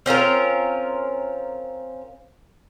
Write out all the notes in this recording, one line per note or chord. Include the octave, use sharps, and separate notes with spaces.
C4 C#4 F4 A#4